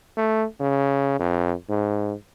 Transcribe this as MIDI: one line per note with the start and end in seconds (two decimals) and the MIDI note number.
0.17 0.45 57
0.60 1.16 49
1.19 1.53 41
1.69 2.13 44